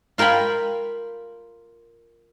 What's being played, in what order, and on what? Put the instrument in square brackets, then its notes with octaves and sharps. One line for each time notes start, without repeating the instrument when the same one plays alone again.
[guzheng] F4 A#4 G5 G#5 B5